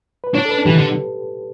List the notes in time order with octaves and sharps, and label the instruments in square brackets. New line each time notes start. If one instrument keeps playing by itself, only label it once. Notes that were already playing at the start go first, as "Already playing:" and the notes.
[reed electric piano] B4
[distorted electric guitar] D4 [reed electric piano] C#5
[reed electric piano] A4
B4
[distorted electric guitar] E3 [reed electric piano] G4
[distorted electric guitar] D3